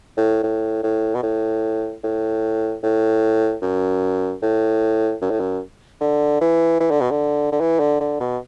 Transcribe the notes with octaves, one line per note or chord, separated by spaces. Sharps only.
A2
A2
A2
B2
A2
A2
A2
F#2
A2
F#2
A2
F#2
D3
E3
E3
D3
B2
D3
D3
E3
D3
D3
B2